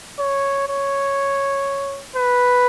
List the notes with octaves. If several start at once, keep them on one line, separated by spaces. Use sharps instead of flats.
C#5
C#5
B4